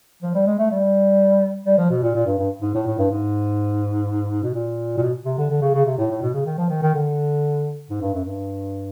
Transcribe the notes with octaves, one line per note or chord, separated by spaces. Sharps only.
F3
G3
G#3
A3
G3
G3
F3
B2
A#2
A#2
G2
G2
G#2
A2
A2
G2
G#2
B2
A#2
A#2
B2
C3
D3
D3
C#3
C#3
C3
A2
A2
B2
C#3
D#3
F3
D#3
D#3
D3
G#2
G2
F#2
G2